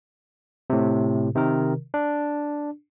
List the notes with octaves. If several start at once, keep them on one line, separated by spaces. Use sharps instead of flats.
A2 C3
C3 D#3 A#4
D4